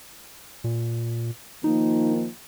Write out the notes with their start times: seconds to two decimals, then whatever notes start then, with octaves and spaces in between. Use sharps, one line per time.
0.64 A#2
1.64 D#3 F3 A#3 D#4